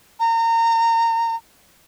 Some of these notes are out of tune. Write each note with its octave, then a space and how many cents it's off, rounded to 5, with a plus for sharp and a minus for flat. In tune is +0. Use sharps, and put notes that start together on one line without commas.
A#5 -30